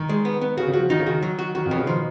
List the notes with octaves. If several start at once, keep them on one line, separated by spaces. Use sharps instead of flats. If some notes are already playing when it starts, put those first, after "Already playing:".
Already playing: D#3
G#3
B3
B3
C#3 F#4
C#3
F#4
F3
D#3 D#4
C#3
D#3 F#4
F#3
F#4
D#3 F#4
F2 F3
B2
C#3
D#3 F3